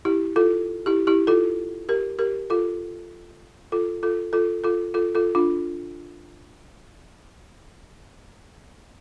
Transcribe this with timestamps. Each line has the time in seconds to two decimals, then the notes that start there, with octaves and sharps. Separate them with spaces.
0.05 E4 G4
0.36 F4 A4
0.86 E4 G4
1.07 E4 G4
1.27 F4 A4
1.89 G4 A#4
2.19 G4 A#4
2.50 F4 A4
3.72 F4 A4
4.03 F4 A4
4.33 F4 A4
4.64 F4 A4
4.94 F4 A4
5.15 F4 A4
5.35 D4 F4